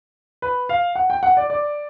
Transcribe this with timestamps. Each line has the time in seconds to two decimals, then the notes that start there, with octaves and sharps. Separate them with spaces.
0.42 B4
0.69 F5
0.95 F#5
1.10 G5
1.23 F#5
1.37 D5
1.50 D5